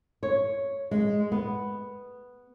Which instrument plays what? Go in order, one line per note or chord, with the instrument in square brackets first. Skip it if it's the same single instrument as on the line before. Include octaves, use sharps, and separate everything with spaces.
[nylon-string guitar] C#5
G#3
B3